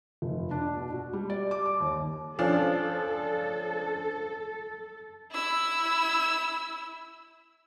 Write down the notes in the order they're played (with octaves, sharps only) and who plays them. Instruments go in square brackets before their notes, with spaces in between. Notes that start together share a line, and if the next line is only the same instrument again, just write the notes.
[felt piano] F1
D4
B2
F#4
G3
D5
D6
D6
D#2
[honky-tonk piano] F3 C#4 D4 [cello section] A4
[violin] E4 E6